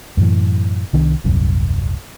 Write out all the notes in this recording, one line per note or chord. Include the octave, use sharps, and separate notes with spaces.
F#2 A2 E3
C2 D#3 D4
D#1 C2 F#2